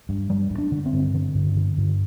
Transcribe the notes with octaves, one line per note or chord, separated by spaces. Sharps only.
G2
G2 G3
G2
D4
D3
C4
G2
D3
G2
D3
G2